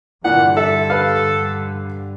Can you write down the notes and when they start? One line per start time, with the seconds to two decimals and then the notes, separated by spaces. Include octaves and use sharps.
0.24 G2 A#2 D3 E3 F#5
0.57 A4 E5
0.90 B4 F5